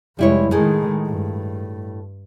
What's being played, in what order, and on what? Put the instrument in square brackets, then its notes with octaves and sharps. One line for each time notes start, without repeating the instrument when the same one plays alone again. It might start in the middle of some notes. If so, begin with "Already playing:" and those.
[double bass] F1 G#3 [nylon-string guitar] G3 E4 C#5
[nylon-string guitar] A2 G#4 [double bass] D#3 G#3
[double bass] G2